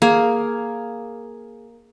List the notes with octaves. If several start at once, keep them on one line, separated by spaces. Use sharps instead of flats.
A#3 G#4